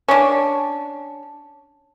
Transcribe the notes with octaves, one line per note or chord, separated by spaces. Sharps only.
C#4 D4